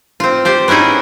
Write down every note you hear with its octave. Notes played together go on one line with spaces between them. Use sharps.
C4 F4
G4 C5 D5
B3 C#4 D#4 E4 G#4